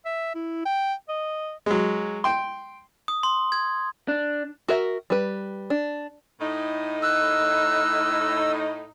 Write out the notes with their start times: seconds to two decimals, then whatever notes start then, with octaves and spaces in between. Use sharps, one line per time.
0.05 E5
0.35 E4
0.65 G5
1.09 D#5
1.66 F#3 G#3
2.24 G5 C6
3.08 D#6
3.23 C6
3.52 G#6
4.08 D4
4.68 F#4 A#4 E5
5.10 G3 B4
5.70 D4
6.40 A2 D#4
7.03 E6 F#6